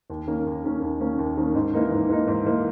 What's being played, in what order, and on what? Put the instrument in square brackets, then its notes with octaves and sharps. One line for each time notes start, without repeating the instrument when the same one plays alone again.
[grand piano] D#2
D#3 A#3 C#4
D#2
D#3 A#3 C#4
D#2
D#3 A#3 C#4
D#2
D#3 A#3 C#4
G#2
E3 A#3 D#4
G#2
E3 A#3 D#4
G#2
E3 A#3 D#4